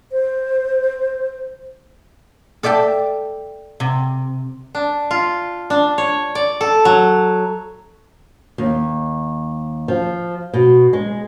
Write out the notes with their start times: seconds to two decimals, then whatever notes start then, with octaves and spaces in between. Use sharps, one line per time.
0.12 C5
2.63 A4 D5 E5 G5 A5
3.80 C3
4.75 D4
5.11 F4
5.70 D4
5.98 C#5
6.35 D5
6.61 A4
6.85 F#3
8.58 D#2
9.88 F3
10.53 B2
10.93 G#3